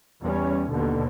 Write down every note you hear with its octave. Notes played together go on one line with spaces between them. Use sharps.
E2 G3 C#4
D#2 B2 D3